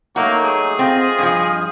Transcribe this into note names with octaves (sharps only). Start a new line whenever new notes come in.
F#3 A3 A#3 D#4 F#4
G#4
C4 F4 D#5
G2 F3